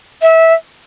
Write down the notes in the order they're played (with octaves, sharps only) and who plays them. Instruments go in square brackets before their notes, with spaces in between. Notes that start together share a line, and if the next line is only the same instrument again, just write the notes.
[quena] E5